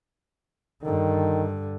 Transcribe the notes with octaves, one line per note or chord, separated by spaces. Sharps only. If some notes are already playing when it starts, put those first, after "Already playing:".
G2 D3 D#3